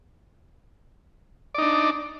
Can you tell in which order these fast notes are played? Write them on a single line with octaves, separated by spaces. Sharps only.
D5 D#4 D4